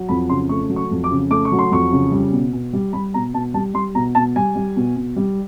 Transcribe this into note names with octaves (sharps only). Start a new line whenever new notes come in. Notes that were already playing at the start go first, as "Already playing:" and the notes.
Already playing: F#3
F2 B5
C#3 C6
A3 C#6
F#3
C#6
F2
D6
C#3
A3 D6
C#6
F#3
C6
F2 C#6
C#3
G3
B2
B2
G3
G3 B5
B2 A#5
B2 A5
G3 A5
G3 C6
B2 A#5
B2 A5
G3 G#5
G3
B2
B2
G3